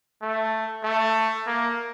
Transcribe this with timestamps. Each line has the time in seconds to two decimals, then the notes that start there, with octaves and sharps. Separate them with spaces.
0.22 A3
0.84 A3
1.47 A#3